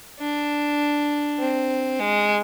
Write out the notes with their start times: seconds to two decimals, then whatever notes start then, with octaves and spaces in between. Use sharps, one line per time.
0.19 D4
1.39 C4
2.00 G#3